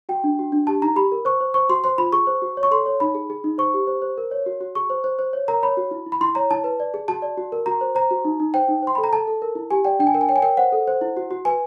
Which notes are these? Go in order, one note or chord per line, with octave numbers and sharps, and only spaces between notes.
F#4 G5
D4
F#4
D4
G4 A5
D#4 A#5
G4 B5
A#4
C5 C#6
C5
C5 C#6
F#4 C6
C5 C6
F4 B5
G#4 C#6
C5
F#4
C#5
C#6
A4 C6
C#5
D#4 B5
G#4
G#4
D#4
C5 C#6
G4
C5
C5
A#4
C#5
F#4
F#4
G#4 C#6
C5
C5
C5
C#5
A#4 A#5
C#5 B5
F#4
E4
E4
B5
E4 C6
C#5 A#5
E4 A5
B4
D5
G#4
F#4 A5
D5
F#4
A#4
F#4 A#5
C5
C5 A#5
F#4
D#4
D#4
C5 G5
D#4
C5 C6
A4 B5
A#5
A4 A5
A4
A#4
E4
G4 G#5
D5 G5
D4 G5
G#5
A#4 G5
G#5
C#5 G5
G#5
A#4 G5
C5 F#5
A4
C5
E4
F#4
F#4
B4 G#5